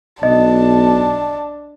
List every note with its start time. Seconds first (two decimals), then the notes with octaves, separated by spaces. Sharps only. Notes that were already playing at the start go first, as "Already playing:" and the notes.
0.23 B1 D4 D#5 A5